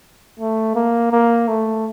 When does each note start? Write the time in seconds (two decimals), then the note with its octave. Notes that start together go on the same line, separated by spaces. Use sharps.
0.40 A3
0.75 A#3
1.12 A#3
1.48 A3